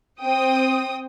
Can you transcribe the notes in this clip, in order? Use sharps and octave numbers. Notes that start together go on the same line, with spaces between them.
C4 G5 D#6